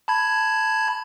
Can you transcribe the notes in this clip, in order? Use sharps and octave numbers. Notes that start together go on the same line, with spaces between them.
A5 B5 G#6